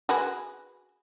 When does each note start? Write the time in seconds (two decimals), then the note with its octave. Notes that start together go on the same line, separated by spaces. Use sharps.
0.09 F#4 G#4 B4